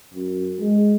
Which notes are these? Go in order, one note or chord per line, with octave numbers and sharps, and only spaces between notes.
F#2
G#3